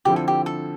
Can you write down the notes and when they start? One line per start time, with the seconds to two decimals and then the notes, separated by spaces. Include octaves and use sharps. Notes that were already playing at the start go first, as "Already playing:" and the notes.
0.05 D3 F3 C4 E4 G4
0.16 A4
0.28 G4
0.46 A4